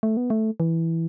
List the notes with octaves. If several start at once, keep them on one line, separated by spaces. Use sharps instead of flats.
A3
B3
A3
E3